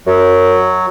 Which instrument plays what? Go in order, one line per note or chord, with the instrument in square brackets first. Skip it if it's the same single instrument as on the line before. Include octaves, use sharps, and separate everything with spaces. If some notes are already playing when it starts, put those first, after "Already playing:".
[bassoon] F#2 [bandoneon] F#3